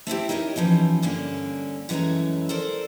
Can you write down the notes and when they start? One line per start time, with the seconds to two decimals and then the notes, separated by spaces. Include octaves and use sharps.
0.07 A3 C4 E4 G4
0.29 D#4 A#4 C#5 D5 E5
0.56 E3 F3 C#4 D#4
1.02 G2 D3 A#3 C#4
1.89 F#2 E3 G#3 A3 C#5 A#5
2.49 A4 A#4 C5 D5